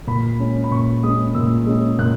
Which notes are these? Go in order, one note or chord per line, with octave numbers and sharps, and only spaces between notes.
A#2 B5
G#3 C#4
B5
A#2 C#6
G#3 C#4 D#6
A#2 E6
G#3 C#4
A#2 F#6